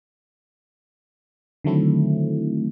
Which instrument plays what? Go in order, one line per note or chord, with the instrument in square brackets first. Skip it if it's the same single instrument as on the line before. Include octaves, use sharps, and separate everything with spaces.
[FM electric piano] D3 D#3 F#3 A3 C4 E4